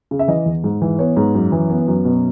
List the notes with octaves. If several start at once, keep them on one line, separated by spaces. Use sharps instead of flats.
C#3
E5
E3 D#5
E2
G#2
E3
B3 C#5
G#2
F#2
E3
B3
F#2
B2